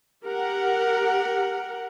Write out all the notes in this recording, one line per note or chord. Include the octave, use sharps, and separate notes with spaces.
G4 A#4 F#5